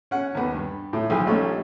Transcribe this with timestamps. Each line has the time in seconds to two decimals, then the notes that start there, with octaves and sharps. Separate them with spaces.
0.11 C#4 F#5
0.35 D#2 B3
0.54 G2
0.93 A2
1.10 B1 F3 G#4
1.26 A#1 G3 A3 C#4 D#4 F4